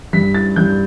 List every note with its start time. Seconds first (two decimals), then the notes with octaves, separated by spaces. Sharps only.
0.13 G2 B6
0.34 A6
0.56 G2 G6